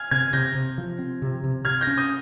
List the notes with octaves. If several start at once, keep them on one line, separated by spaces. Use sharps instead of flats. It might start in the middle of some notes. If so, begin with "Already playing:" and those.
Already playing: G#5 F6 G#6
C3 F6 G#6
C3 G6 A#6
C3
F3
C4
C3
C3
C3 F6 G#6
G6 A#6
C#4
D#6 G6